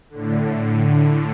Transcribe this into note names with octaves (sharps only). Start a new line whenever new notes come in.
A2 D3